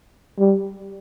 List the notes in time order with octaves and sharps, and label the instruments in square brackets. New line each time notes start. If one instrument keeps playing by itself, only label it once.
[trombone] G3